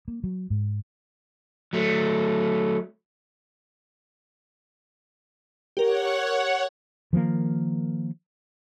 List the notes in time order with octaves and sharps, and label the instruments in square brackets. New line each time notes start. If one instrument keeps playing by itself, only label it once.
[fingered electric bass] A#3
F#3
G#2
[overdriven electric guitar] F#3 A3
[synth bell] G4 A#4 [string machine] C#5 F#5
[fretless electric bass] D#3 F3 G3 A#3